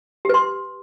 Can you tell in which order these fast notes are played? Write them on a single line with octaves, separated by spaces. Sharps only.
G4 B4 C6